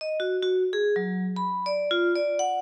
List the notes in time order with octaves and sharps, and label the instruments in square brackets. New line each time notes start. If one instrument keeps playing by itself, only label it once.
[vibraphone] D#5
F#4
F#4
G#4
F#3
B5
D5
F4
D5
F#5